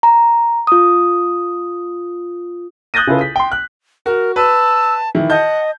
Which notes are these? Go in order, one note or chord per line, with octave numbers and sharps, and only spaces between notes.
A#5
F4 D#6
D#6 F#6 G6 A6 A#6 D#7
C#3 E4 F4 A4 B4
B6
G5 C6
F#6
F#4 A#4
B4 A5 E6
D#3 E3 E4
D#5 F#5 A5 G6